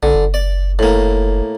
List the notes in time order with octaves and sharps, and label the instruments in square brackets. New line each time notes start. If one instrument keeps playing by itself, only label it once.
[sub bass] A#1 [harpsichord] D3
[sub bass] F#1
[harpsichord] D5
A2 A#3